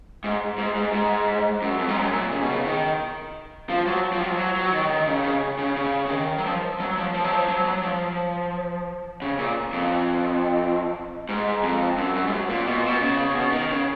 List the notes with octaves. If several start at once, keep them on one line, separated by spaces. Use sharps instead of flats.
G#2
G#2
G#2
G#2
F#2
F2
G#2
F#2
A#2
C#3
B2
C#3
D#3
F3
F#3
F3
F#3
F3
F#3
F#3
D#3
D#3
C#3
C#3
C#3
C#3
C#3
D#3
F#3
F3
F#3
F3
F3
F#3
F3
F#3
F#3
F3
C#3
A#2
F2
G#2
F2
F#2
F#2
G#2
F#2
A#2
B2
A#2
B2
C#3
C#3
B2
D#3
C#3